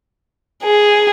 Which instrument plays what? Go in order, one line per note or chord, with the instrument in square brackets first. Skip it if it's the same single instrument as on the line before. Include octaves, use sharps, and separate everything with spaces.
[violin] G#4